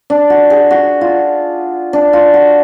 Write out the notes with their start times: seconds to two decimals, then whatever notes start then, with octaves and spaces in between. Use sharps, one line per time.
0.10 D4
0.30 F#4
0.50 G#4
0.71 F#4
1.01 F4
1.93 D4
2.13 F4
2.34 F#4